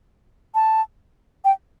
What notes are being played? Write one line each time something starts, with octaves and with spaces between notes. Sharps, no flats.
A5
G5